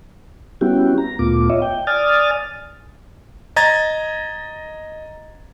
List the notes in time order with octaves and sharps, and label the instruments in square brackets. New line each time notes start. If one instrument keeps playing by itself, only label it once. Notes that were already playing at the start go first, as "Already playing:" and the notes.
[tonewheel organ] G3 B3 C#4 E4 F#4 G4
A#5
D2 A#2 A3 B3 F4 D6
F4 C#5 D#5 E5
G5
D5 G#5 D#6 F6 A6
[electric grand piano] D#5 A#5 G#6 A6